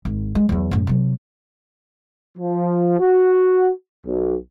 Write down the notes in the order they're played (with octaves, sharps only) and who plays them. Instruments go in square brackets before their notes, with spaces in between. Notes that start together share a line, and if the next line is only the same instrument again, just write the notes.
[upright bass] G#1
G#3
E2 F#3
F#2 A2
C3 F#3
[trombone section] F3
F#4
B1